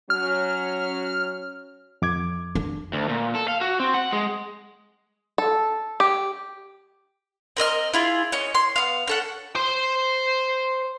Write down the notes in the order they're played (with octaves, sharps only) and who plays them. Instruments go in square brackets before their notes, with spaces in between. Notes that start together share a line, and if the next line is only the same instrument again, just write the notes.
[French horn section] F#3 C#4 [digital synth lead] F6
[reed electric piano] F2 D6 G#6
[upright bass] D4
[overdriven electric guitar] D2
A#2
A4
F5
F#4
C4
F#5
G#3
[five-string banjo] A4
G4
[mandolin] C4 A#4 D#5 F6
E4 F4 G#4
C#4 C#5 D#5
C6
B3 F5
C#4 A4 F#5
[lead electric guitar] C5 C6